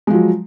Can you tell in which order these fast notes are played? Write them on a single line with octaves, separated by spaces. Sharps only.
G#3 F3 F#3